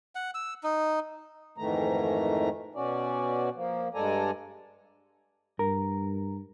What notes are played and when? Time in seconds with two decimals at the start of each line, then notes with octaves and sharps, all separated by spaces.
0.15 F#5
0.35 E6
0.63 D#4
1.58 F2 G#2 D#3 E3 A3 A#5
2.75 B2 C#4 F#4 D5
3.55 F3 A#3
3.94 G2 G#3 A4 D5 G#5 A#5
5.59 G2 A#4